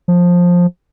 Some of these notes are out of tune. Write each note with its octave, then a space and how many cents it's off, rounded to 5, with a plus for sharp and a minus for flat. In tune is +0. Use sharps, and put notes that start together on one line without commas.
F3 +15